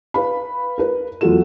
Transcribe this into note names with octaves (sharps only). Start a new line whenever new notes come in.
B4 F5 B5
A#4 B4
E2 F#3 F4 F#4 A4 E7